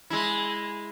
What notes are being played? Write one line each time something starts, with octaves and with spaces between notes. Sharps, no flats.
G#3 E4